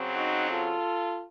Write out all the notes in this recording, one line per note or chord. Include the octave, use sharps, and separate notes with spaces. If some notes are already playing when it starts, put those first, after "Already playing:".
Already playing: C#3 F#3 C4
D#4 F#4
F4 A4